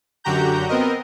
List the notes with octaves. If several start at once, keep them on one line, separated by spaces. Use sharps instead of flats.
F#2 D3 F#4 G4 A#5 G6
B3 C4 A#4 D#5